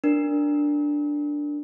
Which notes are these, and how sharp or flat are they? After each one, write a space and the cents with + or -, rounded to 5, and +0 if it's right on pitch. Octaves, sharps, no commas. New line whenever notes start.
D4 +0 A#4 +0